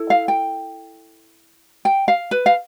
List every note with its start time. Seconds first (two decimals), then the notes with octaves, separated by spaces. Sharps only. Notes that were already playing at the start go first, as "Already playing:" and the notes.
Already playing: E4 A4
0.10 F5
0.28 G5
1.85 G5
2.08 F5
2.31 B4
2.46 F5